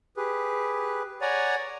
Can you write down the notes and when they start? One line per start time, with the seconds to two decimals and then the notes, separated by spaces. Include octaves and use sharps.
0.17 G4 G#4 B4
1.21 C#5 D5 F#5 G#5 A#5